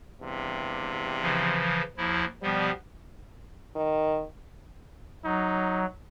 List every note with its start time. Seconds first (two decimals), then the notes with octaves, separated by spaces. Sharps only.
0.21 E2 G2 C3
1.22 C#3 E3 F3
1.97 D#2 F3 E4
2.42 B2 F3 G3 B3
3.76 D#3
5.25 F#3 D#4